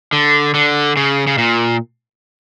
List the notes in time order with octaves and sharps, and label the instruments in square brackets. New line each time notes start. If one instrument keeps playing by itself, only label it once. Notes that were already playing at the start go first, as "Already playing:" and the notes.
[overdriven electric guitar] D3
D3
C#3
C#3
A#2